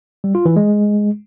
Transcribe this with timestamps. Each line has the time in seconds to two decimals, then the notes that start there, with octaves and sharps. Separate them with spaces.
0.24 G3
0.35 F4
0.46 E3
0.56 G#3